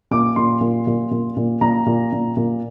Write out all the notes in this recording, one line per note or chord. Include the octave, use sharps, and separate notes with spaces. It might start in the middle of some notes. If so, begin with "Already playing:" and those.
A#2 D6
A#2 C6
A#2
A#2
A#2
A#2
A#2 A#5
A#2
A#2
A#2